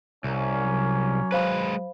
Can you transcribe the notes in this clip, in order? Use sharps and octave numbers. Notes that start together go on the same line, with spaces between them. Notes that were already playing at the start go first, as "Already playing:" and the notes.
C2 A#3 C#4
F#3
G#3 B4 C5 F5 B5